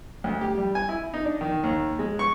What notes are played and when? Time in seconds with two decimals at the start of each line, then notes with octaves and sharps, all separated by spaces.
0.24 D2
0.41 G4
0.58 G3
0.75 G#5
0.89 E4
1.14 D#4
1.25 D4
1.41 D#3
1.64 D#2
1.99 G#3
2.19 C#6